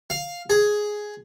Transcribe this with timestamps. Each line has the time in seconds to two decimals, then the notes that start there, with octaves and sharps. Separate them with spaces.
0.10 F5
0.50 G#4